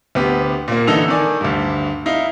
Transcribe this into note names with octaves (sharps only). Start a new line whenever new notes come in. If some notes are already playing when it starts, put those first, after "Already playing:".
D2 B3 G4
A#2 A#3
D3 E3 D#4 A4 E6 F7
D#3 D5 G#5
D2 G2
D#4 E4 F5